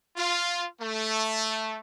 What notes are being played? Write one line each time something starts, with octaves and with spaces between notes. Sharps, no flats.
F4
A3